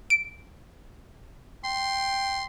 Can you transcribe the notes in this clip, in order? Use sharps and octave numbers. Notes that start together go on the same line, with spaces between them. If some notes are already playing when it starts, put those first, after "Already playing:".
D7
G5 C6